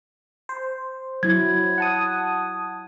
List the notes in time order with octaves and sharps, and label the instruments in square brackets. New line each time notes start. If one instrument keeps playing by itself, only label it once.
[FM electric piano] C5
[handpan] F#3 E4 [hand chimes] G#6
[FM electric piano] F#5 A5 D#6